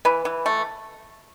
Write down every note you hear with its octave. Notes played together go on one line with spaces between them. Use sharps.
E3 B4
E3
A3